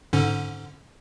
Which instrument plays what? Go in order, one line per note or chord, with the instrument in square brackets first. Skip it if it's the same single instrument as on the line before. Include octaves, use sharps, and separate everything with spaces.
[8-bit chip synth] G#2 D3 C#4